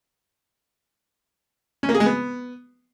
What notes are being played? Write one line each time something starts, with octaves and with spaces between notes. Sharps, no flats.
C#4
A#3
G#4
G#3
B3